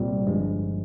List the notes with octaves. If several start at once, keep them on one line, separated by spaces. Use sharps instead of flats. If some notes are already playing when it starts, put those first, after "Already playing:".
Already playing: C2 A#2 G3 C4
G1 G2 F3 G#3